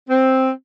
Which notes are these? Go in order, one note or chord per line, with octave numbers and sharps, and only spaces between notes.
C4